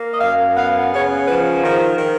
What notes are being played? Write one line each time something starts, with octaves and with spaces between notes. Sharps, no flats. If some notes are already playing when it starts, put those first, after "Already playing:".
Already playing: A#3
D#5
F#2 F5
B3 F5
C#3 C#5
F3 B4
D#3
D#3